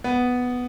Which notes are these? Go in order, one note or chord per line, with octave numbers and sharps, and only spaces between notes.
B3